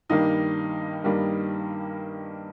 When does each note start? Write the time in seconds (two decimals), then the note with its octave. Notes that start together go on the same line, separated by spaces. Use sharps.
0.09 G2 D#3 G3 A#3 D#4
1.04 G2 D#3 G3 A#3